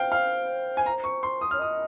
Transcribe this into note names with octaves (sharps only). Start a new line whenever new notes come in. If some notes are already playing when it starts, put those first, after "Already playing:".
Already playing: C5 F5 G5
F5
G#5
A#5
C#6
C6
D#6
C#5 F6
D#5 D#6